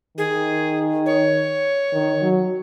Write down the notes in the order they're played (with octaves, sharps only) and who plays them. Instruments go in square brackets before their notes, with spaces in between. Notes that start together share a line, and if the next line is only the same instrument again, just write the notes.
[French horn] D#3 [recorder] G#4
[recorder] C#5
[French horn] D#3
F#3